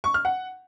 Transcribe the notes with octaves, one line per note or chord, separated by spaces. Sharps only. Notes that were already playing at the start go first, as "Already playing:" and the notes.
C#6
F6
F#5